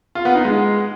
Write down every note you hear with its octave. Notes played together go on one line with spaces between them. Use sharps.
F4
B3
D#4
G#3